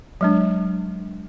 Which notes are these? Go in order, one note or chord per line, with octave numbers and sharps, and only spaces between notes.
F#3 G#3 D4